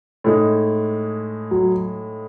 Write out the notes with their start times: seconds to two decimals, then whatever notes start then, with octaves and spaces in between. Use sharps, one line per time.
0.24 A2 G#3 D#4
1.51 F#3